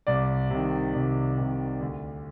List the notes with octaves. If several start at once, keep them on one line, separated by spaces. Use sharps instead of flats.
C2 D5
C3 D#3
C2
C3 D#3
D2